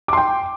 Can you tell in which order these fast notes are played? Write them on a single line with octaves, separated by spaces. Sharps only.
D6 C6 G5